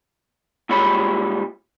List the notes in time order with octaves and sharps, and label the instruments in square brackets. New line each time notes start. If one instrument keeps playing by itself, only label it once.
[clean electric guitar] A#2 G3 G#3 F4 C#5 B5